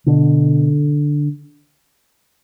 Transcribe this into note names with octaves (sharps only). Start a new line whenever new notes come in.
B2 D3